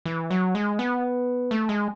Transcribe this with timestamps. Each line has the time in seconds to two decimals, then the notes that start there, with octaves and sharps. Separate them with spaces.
0.06 E3
0.31 F#3
0.55 G#3
0.79 B3
1.51 A3
1.69 G#3